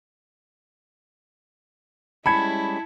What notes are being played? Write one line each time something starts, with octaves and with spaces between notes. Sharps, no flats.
G3 G#3 C#4 E4 A5 B5 G#6 C#7